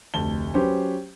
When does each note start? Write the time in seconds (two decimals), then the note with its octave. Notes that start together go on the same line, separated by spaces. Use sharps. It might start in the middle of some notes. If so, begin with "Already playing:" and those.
0.14 F1 D2 A5 G7
0.54 F#3 C#4 G4 B4 C5